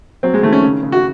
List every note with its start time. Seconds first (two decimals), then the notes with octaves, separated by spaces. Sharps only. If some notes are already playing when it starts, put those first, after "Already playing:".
0.23 F#3 C4
0.34 G#3
0.43 D#3 A3
0.53 C#4
0.63 C#3
0.83 C#3
0.92 F#4